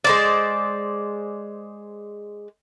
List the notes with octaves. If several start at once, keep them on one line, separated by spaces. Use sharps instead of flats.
G#3 C5 D5